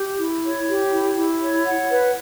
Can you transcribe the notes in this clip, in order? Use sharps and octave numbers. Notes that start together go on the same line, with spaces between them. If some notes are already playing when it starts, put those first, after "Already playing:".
Already playing: G4
E4
C#5
G4
E4
E4
C#5
F#5
B4